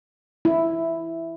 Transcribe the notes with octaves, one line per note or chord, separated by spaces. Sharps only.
E4